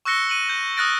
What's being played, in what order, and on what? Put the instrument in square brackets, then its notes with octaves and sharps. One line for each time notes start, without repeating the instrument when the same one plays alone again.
[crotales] C#6 E6 F#6 A#6 C#7 G7
C#7 D#7 F#7
G6
D#6 F6 F#6 A6 A#6 D7